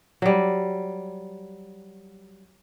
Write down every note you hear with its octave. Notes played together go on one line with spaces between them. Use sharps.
F#3 G3